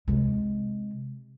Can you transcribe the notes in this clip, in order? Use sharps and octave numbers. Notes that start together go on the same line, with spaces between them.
C3 G#3